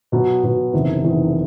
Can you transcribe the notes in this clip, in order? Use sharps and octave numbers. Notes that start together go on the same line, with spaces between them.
B2 F#3 B3
B2 F#3 B3
F#1 E2 C3 D#3
F#1 E2 C3 D#3